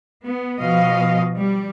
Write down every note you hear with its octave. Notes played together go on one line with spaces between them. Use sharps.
B3
B2 F3 D#5 F5
G3